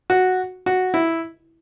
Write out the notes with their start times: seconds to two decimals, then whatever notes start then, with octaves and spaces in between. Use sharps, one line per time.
0.10 F#4
0.66 F#4
0.94 E4